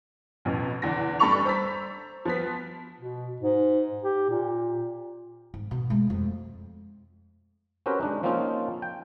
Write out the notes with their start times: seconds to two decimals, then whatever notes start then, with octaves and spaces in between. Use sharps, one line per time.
0.45 A1 F2 B2
0.82 E2 D3 A#6
1.19 G2 D4 A4 B5 C#6 F7
1.45 C5 A#5 E6 A6 B6
2.25 F3 B3 B6
3.01 B2
3.42 G#2
4.04 G4
4.30 A#2
5.54 G#2
5.71 B2
5.90 G#3 A3
6.10 F2
7.86 C4 C#4 F#4 G4 A#4 B4
8.01 G#3 D4 D#4
8.23 F3 A#3 C4 C#4 D#4 F4
8.82 G5